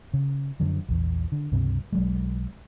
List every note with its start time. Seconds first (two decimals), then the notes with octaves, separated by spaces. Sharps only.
0.14 C#3
0.60 F#2 D3 F3
0.89 A#1 E2
1.32 D3
1.52 C#2 G2 C3
1.93 B1 F#3 G#3